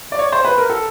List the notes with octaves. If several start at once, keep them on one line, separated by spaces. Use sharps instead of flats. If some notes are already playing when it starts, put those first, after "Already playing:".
D5
C#5
C5
B4
A#4
A4